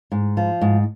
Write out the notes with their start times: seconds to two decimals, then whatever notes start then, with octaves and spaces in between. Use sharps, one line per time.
0.12 G#2
0.37 F3
0.61 G#2